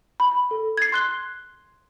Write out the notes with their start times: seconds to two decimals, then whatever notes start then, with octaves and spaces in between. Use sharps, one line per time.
0.20 B5
0.51 A4
0.77 G#6 A6 C7
0.92 C6 F#6 G7